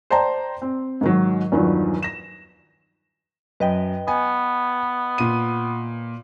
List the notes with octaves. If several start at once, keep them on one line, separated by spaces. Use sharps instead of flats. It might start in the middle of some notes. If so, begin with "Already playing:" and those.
C5 D5 G5 A5 A#5
C4
G#2 D#3 F#3
E2 G2 D#3 F3 F#3
A#6 E7
F#2 B4 D#5 G5
B3 G#5
A#2 D#7